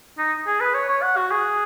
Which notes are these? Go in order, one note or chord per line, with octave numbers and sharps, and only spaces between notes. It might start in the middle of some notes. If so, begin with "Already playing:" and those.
D#4
G#4
B4
C#5
C#5
F#5
F#4
G#4